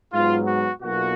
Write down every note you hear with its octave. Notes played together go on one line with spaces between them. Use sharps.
G#2 F#3 B3 F4
F#4
B1 B2 A#3 F4 F#4